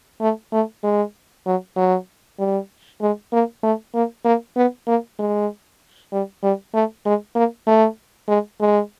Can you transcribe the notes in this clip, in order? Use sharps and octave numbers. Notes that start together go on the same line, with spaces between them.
A3
A3
G#3
F#3
F#3
G3
G#3
A#3
A3
A#3
A#3
B3
A#3
G#3
G3
G3
A3
G#3
A#3
A3
G#3
G#3